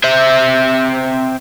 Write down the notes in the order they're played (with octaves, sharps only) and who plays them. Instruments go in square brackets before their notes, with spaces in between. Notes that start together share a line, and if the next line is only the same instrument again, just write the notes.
[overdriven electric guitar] C4 E5